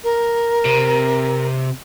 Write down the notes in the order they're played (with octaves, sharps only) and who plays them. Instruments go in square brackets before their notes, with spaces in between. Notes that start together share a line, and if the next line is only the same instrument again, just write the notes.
[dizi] A#4
[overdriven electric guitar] C3